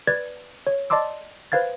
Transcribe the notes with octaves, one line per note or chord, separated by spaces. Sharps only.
B4 D5 G#6 A6
C#5
D5 D#5 A5 C6 D6 E6
B4 C5 F5 G#6 A6